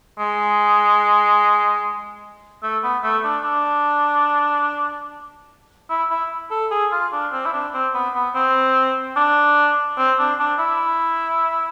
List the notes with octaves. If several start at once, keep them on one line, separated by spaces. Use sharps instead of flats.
G#3
A3
B3
A3
D4
D4
E4
E4
A4
G#4
F4
D4
C4
E4
D4
C4
B3
B3
C4
D4
C4
D4
D4
E4